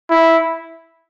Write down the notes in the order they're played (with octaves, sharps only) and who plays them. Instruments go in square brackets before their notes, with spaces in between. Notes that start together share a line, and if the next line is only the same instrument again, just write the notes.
[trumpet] E4